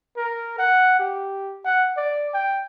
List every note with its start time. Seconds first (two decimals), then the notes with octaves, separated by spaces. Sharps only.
0.17 A#4
0.59 F#5
1.00 G4
1.65 F#5
1.97 D5
2.34 G5